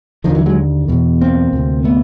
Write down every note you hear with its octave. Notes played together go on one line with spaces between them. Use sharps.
D#2 D3 D#3 F3
E3 F#3
F#3 G#3
E2 B2
A#3 C4
D2 C3
A3 B3